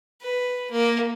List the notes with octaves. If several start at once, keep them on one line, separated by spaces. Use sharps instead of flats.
B4
A#3